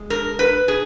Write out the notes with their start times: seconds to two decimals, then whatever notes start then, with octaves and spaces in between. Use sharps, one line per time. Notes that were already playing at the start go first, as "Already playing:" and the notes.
Already playing: G#3
0.10 A#4
0.39 B4
0.68 G#4